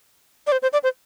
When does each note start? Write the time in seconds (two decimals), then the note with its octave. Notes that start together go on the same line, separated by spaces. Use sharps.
0.47 D5
0.52 C5
0.62 C5
0.73 D5
0.83 C5